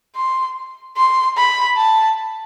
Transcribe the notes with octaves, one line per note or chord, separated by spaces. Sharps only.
C6
C6
B5
A5